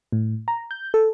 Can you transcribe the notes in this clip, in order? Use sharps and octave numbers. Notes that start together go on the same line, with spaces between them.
A2
A#5
G6
A4